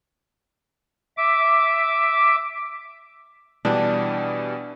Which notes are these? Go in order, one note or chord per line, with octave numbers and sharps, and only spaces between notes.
E5 D6
B2 E3 G3 D4